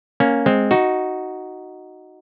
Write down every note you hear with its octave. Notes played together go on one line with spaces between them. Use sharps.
A#3 C#4
G#3 C4
D#4 F#4